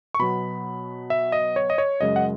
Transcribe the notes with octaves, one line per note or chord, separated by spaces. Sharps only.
C#6
B2 F#3 B3 B5
E5
D#5
C#5
D#5
C#5
F#2 C#3 G#3 D#5
F#5